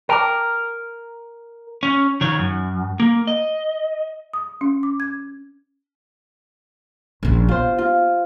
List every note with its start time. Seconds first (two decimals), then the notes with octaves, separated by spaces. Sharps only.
0.09 A#4 G5 A5 D6
1.83 C#4
2.21 D#3 C#5
2.39 F#2
3.00 A#3
3.27 D#5
4.34 D#6
4.61 C#4
4.83 D6
5.00 G#6
7.23 A#1 C#4
7.49 B3 F4 C5
7.78 F4